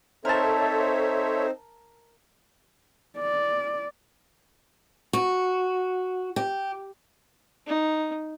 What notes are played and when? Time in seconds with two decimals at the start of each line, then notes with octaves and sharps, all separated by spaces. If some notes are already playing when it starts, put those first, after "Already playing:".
0.25 C4 D#4 A4 A#4 C5 C#5 E5 A5
3.18 D5
5.13 F#4
6.36 G4
7.67 D#4